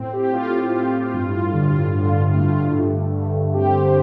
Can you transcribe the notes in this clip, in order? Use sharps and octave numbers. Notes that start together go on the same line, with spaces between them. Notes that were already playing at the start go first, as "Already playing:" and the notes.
Already playing: A2 C4
G4
A2 F4
A2
G2
D3
D3
A3
G2
G2
C4 G4
C5